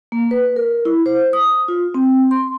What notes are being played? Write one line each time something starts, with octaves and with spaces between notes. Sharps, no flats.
A#3
B4
A#4
E4
C5
D#6
F4
C4
C6